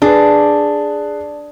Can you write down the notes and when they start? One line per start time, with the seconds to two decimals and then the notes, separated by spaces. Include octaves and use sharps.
0.02 D4 G#4 B4